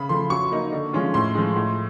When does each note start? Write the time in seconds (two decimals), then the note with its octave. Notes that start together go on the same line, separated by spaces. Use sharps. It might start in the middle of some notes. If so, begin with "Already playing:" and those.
Already playing: C#3 B5
0.09 F3 A3 C6
0.30 F#3 C#6
0.51 A#3 D#4
0.72 D3
0.93 F3 G#3 C#4 F4
1.14 A2 C6
1.35 F3 G#3
1.56 A2